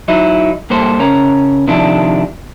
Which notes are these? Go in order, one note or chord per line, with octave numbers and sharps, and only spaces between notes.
F#3 D#4 E4
G2 A#3 A4 C5
C#3 C#4 A#4
C3 D#3 F3 D4 E4